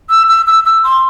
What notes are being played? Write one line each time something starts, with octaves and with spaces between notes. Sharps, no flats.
E6
E6
E6
E6
C6